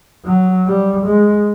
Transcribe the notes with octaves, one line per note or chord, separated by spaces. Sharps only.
F#3
G3
G#3